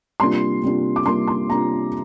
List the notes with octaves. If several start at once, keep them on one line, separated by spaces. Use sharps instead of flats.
C3 G3 A#3 D4 F4 C6
C3 G3 A#3 D4 F4
D6
C3 G3 A#3 D4 F4 C6
C6
C3 G3 A#3 D4 F4 A#5